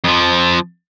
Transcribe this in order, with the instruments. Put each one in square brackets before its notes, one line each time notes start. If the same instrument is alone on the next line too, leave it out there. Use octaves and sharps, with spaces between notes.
[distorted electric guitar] F2 F3